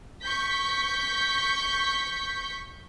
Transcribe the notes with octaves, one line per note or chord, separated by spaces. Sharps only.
C#6 G6 B6